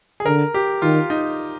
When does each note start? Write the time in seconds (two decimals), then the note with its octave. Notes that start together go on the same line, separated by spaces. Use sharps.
0.20 G#4
0.26 D3 A#4
0.54 G4
0.82 D#3 F4
1.10 D#4